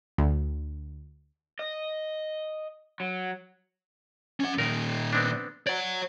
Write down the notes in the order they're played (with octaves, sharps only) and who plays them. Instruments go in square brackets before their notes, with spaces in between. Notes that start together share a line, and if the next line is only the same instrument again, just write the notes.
[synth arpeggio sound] D2
[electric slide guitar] D#5
F#3
[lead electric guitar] C#4 F#5
[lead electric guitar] A#2 D#3 [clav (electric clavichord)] A#4
[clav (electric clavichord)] B3 C4 D4
[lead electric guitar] C#5 F#5 [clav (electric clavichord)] D5